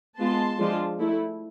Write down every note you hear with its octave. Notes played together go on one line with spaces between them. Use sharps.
G#3 B3 F4 A5 C6
F3 G#3 D4 F4
A3 E4